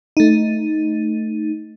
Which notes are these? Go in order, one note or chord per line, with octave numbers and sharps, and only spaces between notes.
A3 D#4